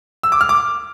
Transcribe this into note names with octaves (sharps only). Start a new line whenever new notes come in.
E6
D6
F6
D6